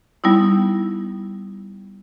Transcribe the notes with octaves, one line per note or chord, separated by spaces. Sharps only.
G3 B3 D#4 E4